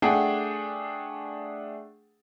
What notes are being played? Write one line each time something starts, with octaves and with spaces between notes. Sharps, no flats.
A3 D4 G#4 F#5 G5